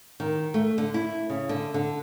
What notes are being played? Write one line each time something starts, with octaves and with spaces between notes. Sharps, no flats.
D#3
A3
D3
E4
C#3
D3
D3